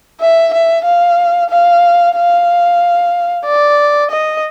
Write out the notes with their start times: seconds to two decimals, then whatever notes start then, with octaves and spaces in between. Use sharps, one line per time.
0.21 E5
0.54 E5
0.85 F5
1.50 F5
2.16 F5
3.46 D5
4.11 D#5